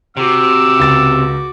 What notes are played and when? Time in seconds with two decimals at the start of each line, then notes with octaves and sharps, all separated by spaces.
0.17 C3 F#4 D6 E6
0.79 C#2 A6